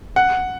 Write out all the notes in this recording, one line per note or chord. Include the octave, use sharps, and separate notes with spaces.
F#5